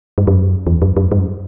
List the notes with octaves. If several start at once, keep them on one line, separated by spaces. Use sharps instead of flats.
G2
F#2
E2
F#2
F#2
G2
F#2